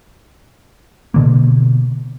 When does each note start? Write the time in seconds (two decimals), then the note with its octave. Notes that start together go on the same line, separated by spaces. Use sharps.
1.14 B2 D3 A#3